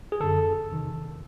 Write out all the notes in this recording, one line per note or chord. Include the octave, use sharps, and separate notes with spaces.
G#4
F#2 D3 A4
E2 C3 D#3